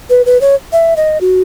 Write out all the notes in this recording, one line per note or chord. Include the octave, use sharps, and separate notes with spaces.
B4
B4
C#5
E5
D#5
F#4